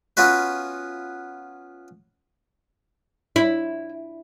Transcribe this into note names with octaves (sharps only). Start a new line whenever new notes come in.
B3 C#4 F4 F#4 B4
E4